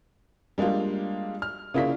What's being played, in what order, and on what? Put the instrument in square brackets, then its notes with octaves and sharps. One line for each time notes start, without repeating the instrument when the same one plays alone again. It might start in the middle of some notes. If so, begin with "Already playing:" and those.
[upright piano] G3 G#3 A#3 D4 F4
F6
C#3 A#3 E4 F4 D5 B6